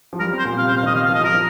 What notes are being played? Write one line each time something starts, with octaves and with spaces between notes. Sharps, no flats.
F3
G3 A#4
C4
C5
A#2
C3 F5
C5
C3
F5
D#3 D#5
F5
F5
F3
D#5
F3 A#4
F3